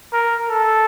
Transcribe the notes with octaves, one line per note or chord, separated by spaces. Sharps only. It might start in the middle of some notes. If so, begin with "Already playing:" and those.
A#4
A4